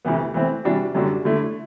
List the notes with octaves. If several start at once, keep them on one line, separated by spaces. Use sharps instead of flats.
D2 C3 E3 B3
E3 A3 C4
C3 E3 G3 D4 F#4
F#2 D3 G3 D4 F#4
D3 A3 E4